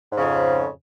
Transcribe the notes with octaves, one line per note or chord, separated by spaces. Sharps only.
F2 G#2 C#3